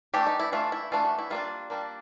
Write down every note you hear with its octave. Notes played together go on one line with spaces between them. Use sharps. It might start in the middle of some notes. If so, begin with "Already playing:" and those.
E3 A3 D4 G4
D#4
E4
E3 A3 D4 F4
E4
E3 A3 D4 F4
F#4
E4
G3 A#3 D4 F4
G3 A#3 D4